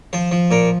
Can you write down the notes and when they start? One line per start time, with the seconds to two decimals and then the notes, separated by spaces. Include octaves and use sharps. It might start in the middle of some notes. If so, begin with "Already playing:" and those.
0.13 F3 C5
0.31 F3
0.51 A#2 A#4